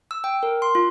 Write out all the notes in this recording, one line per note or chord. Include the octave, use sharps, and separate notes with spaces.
E6
G5
A#4
C6
F4